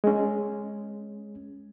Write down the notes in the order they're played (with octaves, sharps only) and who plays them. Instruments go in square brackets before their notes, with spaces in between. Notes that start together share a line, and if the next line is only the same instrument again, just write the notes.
[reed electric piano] G#3 C#4